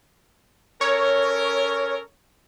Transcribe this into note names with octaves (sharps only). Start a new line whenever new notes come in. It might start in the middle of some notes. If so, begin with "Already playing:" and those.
C#4 A4 A#4 C#5